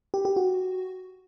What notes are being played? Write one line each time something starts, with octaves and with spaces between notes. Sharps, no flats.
G4
G4
F#4